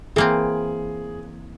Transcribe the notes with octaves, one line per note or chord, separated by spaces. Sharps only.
E3 A#3 C4 G#4